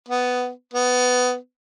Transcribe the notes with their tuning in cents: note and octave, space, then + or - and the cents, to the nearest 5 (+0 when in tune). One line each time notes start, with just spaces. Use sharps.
B3 +10
B3 +15